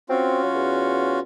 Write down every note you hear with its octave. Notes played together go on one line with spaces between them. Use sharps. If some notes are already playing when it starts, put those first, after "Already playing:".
C4 C#4 F4 F#4
F#3
E2